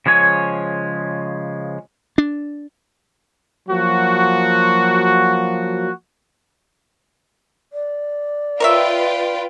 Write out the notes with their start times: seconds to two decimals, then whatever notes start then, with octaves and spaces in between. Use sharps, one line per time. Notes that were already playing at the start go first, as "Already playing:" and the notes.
0.06 C#3 F3 G#3 C#5 G#5
2.18 D4
3.69 F3 F#3 A#3 F#4
7.73 D5
8.60 F4 A#4 B4 C#5 E5 G5